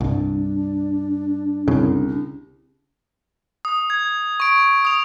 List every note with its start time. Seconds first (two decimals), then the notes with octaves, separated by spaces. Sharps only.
0.01 C2 G2 D4
1.68 C2 C#3
3.65 D#6
3.90 G#6
4.40 C#6 D7
4.85 D#6 F7